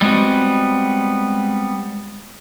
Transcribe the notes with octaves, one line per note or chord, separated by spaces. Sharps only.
G3 G#3 B3 C4 F#4